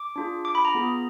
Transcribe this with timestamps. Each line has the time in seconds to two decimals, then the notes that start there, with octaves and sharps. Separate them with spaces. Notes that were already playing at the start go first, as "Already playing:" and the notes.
Already playing: D6
0.16 D4 F4 G#4
0.45 D6
0.55 B5
0.65 A#5
0.75 B3 F4 G#4